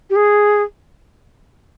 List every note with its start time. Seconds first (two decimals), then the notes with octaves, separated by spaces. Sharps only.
0.10 G4
0.16 G#4